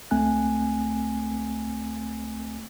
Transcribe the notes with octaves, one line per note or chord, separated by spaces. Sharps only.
C#2 A3 C4 G#5 F#6